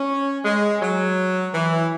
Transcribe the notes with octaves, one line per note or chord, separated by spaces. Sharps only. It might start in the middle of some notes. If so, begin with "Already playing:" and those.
Already playing: C#4
G#3
F#3
E3